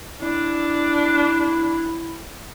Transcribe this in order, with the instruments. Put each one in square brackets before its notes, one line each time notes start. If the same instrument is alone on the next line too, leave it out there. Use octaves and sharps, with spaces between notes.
[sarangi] D4 [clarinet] E4